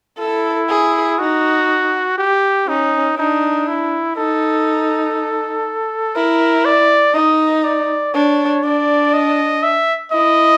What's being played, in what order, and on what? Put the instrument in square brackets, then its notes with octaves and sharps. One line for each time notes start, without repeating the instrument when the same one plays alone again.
[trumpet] E4 [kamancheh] A4
[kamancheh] G#4
[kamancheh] D#4 [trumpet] F#4
[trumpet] G4
[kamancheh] C#4 [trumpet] D#4
[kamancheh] D4 [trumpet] D#4
[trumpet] E4
[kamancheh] D#4 [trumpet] A4
[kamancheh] E4 [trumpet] A#4
[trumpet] D5
[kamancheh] D#4 [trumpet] D#5
[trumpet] D5
[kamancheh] D4 [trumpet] C#5
[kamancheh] D4 [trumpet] D5
[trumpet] D#5
E5
[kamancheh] E4 [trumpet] D#5